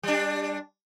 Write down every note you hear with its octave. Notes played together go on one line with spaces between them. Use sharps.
G3 D4